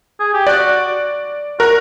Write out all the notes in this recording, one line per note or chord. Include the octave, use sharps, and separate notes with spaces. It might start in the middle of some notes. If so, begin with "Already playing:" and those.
G#4
G4
F#4 D5
F#4 A#4